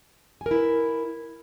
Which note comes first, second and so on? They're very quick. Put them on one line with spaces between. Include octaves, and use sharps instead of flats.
G#5 A#4 E4 B4